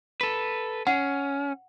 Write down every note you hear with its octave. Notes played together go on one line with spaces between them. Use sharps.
A4 B4
C#4 F#5